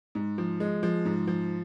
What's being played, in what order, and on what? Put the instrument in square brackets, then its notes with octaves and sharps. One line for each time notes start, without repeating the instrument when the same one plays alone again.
[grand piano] G#2
F3
G#3
F3
G#2
F3